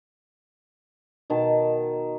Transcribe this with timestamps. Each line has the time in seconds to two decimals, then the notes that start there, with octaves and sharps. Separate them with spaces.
1.30 B2 D#3 A5